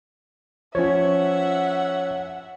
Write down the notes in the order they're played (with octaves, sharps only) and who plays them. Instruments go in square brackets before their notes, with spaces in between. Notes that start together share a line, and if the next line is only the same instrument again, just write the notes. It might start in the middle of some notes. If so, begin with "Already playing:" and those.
[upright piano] F3 C#4 [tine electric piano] C#5 [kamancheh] E5 F#5